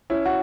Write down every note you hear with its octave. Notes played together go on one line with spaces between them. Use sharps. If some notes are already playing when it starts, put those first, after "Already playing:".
C#4 E4
F#4